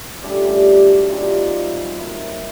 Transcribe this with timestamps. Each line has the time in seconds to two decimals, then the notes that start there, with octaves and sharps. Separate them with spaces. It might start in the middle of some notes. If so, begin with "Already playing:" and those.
0.22 C#3 F3 G3 A3 D4 G4
0.44 G3 G4
0.67 G3 G4
0.88 F#3 F#4
1.10 E3 F3 G3 C4 D#4 F4
1.98 D#3 F#3 A#3 E4